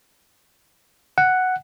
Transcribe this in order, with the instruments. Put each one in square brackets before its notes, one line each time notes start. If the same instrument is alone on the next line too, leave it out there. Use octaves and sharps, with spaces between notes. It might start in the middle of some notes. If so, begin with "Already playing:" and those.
[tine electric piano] F#5